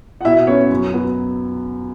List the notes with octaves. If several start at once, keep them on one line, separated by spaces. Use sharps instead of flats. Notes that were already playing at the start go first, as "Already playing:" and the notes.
F#5
B2 E4 E5
B3 C#4 C#5
F#2
F#3 B3